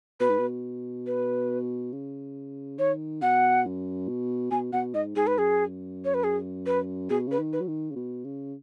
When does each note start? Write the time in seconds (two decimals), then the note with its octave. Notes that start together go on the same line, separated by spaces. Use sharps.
0.20 B2 B4
0.30 G#2
0.39 B2
1.07 B4
1.92 C#3
2.79 D#3 C#5
3.22 B2 F#5
3.65 F#2
4.08 B2
4.51 B2 G#5
4.73 B2 F#5
4.94 G#2 D#5
5.16 G#2 G#4
5.27 B4
5.37 F#2 G#4
6.05 C#5
6.14 B4
6.24 G#4
6.66 B4
7.10 B2 G#4
7.27 C#3 B4
7.39 D#3
7.53 B4
7.60 F#3
7.68 D#3
7.91 C#3
7.96 B2
8.24 C#3